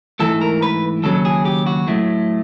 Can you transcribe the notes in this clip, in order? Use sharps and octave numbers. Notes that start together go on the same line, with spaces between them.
G#2 E3 A3 A4
A#4
B4
D#2 C#3 F#3 A4
G#4
G4
F#4
A2 F#3 A3